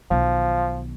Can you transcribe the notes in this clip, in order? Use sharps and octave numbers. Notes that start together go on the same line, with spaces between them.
B1 D#3 F3